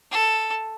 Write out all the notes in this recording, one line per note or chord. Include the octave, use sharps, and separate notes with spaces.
A4